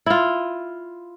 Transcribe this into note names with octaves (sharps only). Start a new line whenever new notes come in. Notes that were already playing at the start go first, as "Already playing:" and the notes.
E4 F4